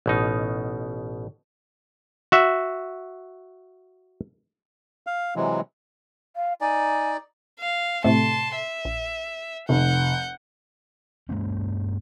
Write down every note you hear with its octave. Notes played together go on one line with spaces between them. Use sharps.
A1 B2 D#4
F#4 E5
F5
C3 E3 F#3 G#3
F5
D#4 D5 G#5
F5
A2 C3 A3 A5 C6
E5
A#1
F1 F#5 G6
G2 G#3 A#3 C#4